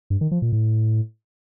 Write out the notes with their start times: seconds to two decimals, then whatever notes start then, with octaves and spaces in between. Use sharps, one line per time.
0.10 G2
0.21 D#3
0.31 F3
0.42 A#2
0.53 A2